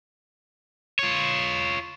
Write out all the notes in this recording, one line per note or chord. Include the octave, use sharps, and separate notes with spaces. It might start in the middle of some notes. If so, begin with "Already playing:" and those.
F4 C#5